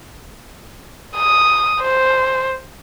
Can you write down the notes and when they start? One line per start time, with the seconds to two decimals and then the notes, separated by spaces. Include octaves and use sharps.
1.17 D#6
1.82 C5